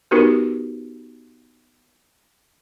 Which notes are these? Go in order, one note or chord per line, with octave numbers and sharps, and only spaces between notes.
B3 D#4 F#4 G4 A#4 B4